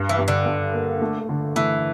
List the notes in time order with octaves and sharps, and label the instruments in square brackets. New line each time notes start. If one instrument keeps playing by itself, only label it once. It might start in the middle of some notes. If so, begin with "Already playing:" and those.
Already playing: [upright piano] G2
[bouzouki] E3
[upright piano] G2
[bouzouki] D3
[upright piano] G2
A#3
A3
D3
[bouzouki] E3 [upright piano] A3